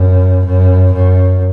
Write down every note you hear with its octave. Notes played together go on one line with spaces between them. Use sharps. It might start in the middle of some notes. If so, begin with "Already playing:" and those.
Already playing: F#2
F#2
F#2